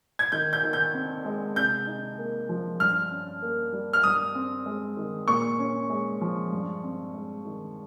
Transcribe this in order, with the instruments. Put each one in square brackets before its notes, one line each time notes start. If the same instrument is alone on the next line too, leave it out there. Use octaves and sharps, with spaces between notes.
[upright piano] G#6
[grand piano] D#3 [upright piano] G6
[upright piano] G6
[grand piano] D#3
[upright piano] G6
[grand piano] C4
G#3
[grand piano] C3 [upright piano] G6
[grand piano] D#4
A#3
F3
[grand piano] G2 [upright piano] F6
[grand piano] C#4
A#3
G3
[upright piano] F6
[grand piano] G2 [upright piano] D#6
[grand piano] C4
G#3
D#3
[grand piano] A#2 [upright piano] C#6
[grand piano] C#4
G#3
F3
G2
C4
G#3
D#3